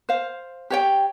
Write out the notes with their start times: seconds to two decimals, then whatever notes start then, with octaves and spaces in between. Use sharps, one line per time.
0.09 C5 F5
0.70 G4 C#5 G5